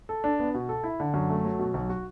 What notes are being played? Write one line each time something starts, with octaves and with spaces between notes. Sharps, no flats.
A4
D4
B3
B2
A4
E4
D3
F#2
A3
F#3
B2
B1
F#4